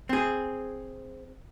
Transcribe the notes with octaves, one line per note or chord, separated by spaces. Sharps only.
C4 G#4